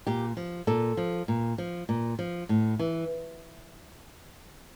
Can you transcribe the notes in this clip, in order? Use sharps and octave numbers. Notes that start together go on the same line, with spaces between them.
A#2 G4
F3
A#2 A4
F3
A#2
F3
A#2
F3
A2
E3